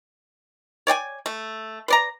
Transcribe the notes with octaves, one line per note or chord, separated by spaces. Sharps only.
C#5 D5 G5 G#5
A3
B4 D5 A#5